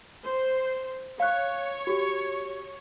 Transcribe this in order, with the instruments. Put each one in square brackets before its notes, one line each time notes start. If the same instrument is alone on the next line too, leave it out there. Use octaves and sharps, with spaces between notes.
[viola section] C5
[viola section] C#5 [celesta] F5 F#6
[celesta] F#4 G4